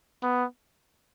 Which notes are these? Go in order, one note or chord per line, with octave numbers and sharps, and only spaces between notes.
B3